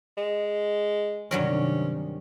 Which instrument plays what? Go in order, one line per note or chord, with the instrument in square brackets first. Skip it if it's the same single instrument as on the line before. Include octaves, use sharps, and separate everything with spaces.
[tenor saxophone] G#3
[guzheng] G2 F#3 A#4 [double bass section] C3 D#3 [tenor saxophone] C#4